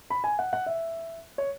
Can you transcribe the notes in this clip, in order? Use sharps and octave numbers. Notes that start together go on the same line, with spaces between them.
B5
G#5
F#5
F#5
E5
C#5